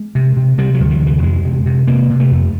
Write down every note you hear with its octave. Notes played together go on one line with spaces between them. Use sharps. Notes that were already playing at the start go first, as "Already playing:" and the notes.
Already playing: G#3
C3
C3
C3 G3
F#3
D2
E3
C3
E3
F2 G#3
C3
C3
C3 A#3
C3
A3
F2